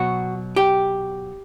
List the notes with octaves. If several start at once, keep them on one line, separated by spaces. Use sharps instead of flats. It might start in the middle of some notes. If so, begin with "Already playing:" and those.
Already playing: B2 F#3 F#4
G4